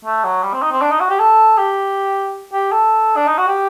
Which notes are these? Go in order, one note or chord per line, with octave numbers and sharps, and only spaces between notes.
A3
F#3
G3
C4
D#4
C4
D4
D#4
F#4
G4
A4
G4
G4
A4
D4
D#4
F#4
G4